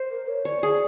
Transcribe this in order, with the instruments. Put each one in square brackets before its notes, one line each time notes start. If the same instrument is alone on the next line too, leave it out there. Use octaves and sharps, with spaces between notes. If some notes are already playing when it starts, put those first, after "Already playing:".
Already playing: [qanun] C5
[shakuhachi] A#4
C#5
[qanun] C#5 [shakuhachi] D5
[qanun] G#4